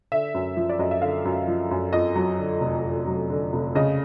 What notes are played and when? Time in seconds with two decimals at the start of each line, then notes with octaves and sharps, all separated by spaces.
0.12 D3 E5
0.35 F#2
0.57 F3
0.69 D5
0.79 F#2 D#5
0.91 E5
1.02 D3 F5
1.25 F#2
1.48 F3
1.71 F#2
1.93 F2 D#5
2.16 F#3
2.38 D3
2.61 F1
2.84 F2
3.07 F#3
3.30 D3
3.53 F1
3.75 C#3 D#5